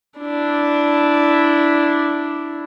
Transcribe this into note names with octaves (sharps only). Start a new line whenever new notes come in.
D4 E4